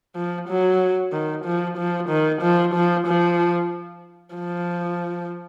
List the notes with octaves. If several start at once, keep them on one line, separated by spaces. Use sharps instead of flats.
F3
F#3
D#3
F3
F3
D#3
F3
F3
F3
F3